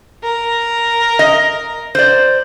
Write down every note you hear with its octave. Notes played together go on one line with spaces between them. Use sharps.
A#4
D#5
C5 D5